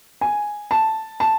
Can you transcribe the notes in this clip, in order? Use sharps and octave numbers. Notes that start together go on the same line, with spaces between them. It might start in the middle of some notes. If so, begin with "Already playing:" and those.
G#5
A5
A5